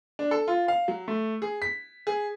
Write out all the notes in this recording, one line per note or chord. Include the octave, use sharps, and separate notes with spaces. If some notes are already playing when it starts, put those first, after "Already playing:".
D4
A4
F4
F5
F#3
A3
G#4
B6
G#4